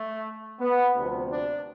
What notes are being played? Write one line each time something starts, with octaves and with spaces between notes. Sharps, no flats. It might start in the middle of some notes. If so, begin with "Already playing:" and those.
Already playing: A3
B3
D2 C3 F3
D4